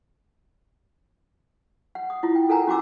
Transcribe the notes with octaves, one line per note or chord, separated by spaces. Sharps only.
F#5
D#6
E4 F4
G5
A4 A#4 F#5 G#5 A#5
C#4 F#4 G#5 D6 E6